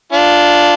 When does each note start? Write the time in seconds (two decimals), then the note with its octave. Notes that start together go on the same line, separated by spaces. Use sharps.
0.12 D4 F4